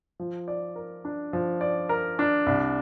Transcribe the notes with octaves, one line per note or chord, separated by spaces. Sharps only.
F3
D5
A#4
D4
F3
D5
A#4
D4
C2